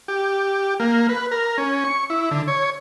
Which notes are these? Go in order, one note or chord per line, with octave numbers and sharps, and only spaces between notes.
G4
A#3
B4
A#4
C#4
C#6
E4
D3
C#5